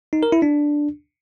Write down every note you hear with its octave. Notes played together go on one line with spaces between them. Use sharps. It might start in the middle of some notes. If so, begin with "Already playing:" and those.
D#4
A#4
E4
D4